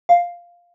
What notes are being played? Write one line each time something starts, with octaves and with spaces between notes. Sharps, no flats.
F5